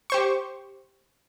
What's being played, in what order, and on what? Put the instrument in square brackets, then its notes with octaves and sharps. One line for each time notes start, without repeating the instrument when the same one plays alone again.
[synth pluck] G4 C5 C#6